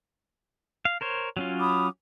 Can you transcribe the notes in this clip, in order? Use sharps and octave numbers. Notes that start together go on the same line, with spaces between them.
F5
A#4 C5 C#5
F#3 C#4 F4
B5 D6 D#6